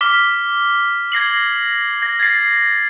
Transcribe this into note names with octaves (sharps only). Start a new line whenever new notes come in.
D6 F6 B6 G7
G#6 A#6 C7 F#7
G#6 A#6
G#6 A6 C7